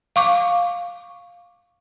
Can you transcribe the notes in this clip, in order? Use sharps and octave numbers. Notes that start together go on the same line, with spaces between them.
F5 C#6 D6